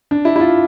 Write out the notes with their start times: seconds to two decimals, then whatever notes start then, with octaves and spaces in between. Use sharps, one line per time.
0.11 D4
0.25 E4
0.36 E4
0.40 F4